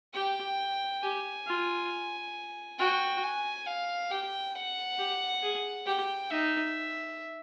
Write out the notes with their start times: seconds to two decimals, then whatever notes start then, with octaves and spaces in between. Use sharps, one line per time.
0.14 G4 G5
1.03 G4 G#5
1.47 F4
2.79 F#4 G5
3.23 G#5
3.67 F5
4.11 G4 G5
4.55 F#5
4.98 G4
5.43 G#4
5.86 G4 G5
6.31 D#4 E5